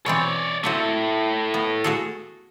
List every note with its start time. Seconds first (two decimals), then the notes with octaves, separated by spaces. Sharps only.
0.06 B2 E3 C4 C#5 D5
0.64 A3 C4 E4 F#4 E5
1.54 B3
1.84 F#4 G#4 A4